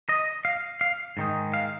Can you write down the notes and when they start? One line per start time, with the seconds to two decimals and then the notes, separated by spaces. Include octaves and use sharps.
0.09 D#5
0.45 F5
0.81 F5
1.17 G#2 D#3 G#3 D#4
1.54 F5